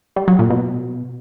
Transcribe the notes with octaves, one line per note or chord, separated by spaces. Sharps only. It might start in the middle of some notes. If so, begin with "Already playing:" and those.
G3
F#3
A#2
B2